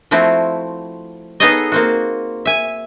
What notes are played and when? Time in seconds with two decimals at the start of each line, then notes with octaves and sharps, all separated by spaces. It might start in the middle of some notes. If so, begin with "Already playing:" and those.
0.11 F3 A3 C4 E4 F#4
1.40 B3 D#4 G#4 A4 C#5 D#5
1.72 A#3 C4 F#4
2.45 E5 G#5